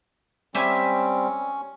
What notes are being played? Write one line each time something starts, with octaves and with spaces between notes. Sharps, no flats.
G3 C4 C#4 G4 E5 G#5